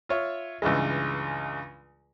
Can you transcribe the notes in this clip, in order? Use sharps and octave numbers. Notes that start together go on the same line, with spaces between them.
F4 C#5 E5
C#2 G2 E3 G#3